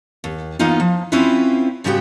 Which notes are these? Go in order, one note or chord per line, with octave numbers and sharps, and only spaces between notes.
D#2
E3 A#3 B3 D#4 F4
F3
C4 C#4 E4 F4 B4
G#2 C#3 G3 B3 F#4 G5